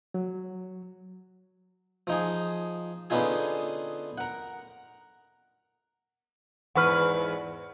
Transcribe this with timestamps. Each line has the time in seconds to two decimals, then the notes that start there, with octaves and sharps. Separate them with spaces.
0.14 F#3
2.07 F3 D#4 G#4
3.10 D3 B3 C#4 D#4 F4 G#4
4.18 A#4 F#5
6.75 E2 G#2 B4 F#5 C#6 F6